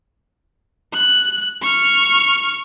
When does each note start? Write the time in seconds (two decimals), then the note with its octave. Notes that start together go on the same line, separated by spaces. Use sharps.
0.93 F#6
1.62 C#6 F6